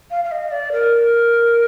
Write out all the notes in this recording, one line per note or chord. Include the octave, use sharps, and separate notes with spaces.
F5
F5
D#5
D5
A#4